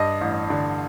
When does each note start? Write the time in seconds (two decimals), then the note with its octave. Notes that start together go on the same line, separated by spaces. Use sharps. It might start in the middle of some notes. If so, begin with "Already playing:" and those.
Already playing: G2 D#5
0.21 A1
0.50 D3